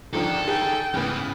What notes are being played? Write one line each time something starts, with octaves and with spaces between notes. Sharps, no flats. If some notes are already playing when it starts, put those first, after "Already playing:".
G#2 D3 D#3 F3 D4 A4
G#4 G5
G#2 C#3 E3 B3